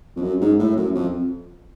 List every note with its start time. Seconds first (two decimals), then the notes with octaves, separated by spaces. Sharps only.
0.16 F2
0.22 F#2
0.41 G#2
0.59 A2
0.77 F#2
0.95 F2